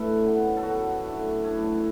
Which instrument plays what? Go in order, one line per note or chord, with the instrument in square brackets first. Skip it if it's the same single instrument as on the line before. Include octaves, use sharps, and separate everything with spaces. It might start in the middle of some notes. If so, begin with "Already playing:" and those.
Already playing: [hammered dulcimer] A2 A3 D4 A4 B4
F#2 F#3 B3
A4
F#2 F#3 B3 F#4
A2 A3 D4
A2 A3 D4 E4